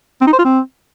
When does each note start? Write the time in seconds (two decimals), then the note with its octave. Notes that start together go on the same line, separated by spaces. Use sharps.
0.21 C4
0.27 D#4
0.33 C5
0.39 F4
0.45 C4